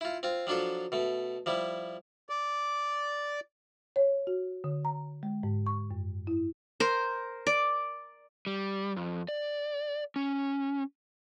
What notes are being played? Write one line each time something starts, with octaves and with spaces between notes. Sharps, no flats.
E4 F4
C4 F4
F3 F#3 D4 F4 A4
B2 A3
F3 G3 E4
D5
C#5
F#4
D3
A#5
G#3
G#2
C#6
F#2
E4
A#4 C5
D5
G3
F2
D5
C#4